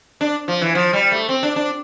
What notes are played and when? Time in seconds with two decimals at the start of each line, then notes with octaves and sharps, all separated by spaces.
0.21 D4
0.48 F3
0.62 E3
0.75 F3
0.93 G3
1.12 A3
1.29 C4
1.43 D4
1.56 D4